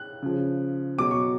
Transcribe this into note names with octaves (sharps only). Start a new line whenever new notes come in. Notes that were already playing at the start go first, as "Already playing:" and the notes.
Already playing: F#6
C#3 F3
B2 F#3 D6
C#6